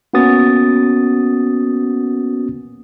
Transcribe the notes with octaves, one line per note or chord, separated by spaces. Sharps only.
A#3 B3 C#4 F#4 D#6 A6